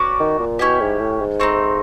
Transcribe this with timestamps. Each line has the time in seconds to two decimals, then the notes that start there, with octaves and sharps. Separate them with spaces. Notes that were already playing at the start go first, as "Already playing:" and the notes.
Already playing: C#4 F#4 B4 D5
0.20 D#3
0.39 A#2
0.59 B2 C#4 E4 G4
0.80 G#2
1.00 A2
1.20 G#2
1.40 A3 C4 D#4